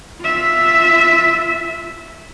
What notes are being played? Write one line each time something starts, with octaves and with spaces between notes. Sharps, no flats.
F4 E5